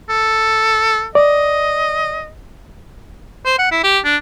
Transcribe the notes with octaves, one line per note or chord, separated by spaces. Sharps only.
A4
D5 D#5
C5
F#5
E4
G4
D4